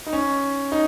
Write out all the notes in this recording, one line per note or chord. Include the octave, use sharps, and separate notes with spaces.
D#4
C#4
D#4